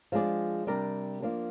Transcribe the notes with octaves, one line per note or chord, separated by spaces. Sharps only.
F3 G#3 D4 G#4 D5
C3 G3 D4 G4 A#4
F3 A#3 D4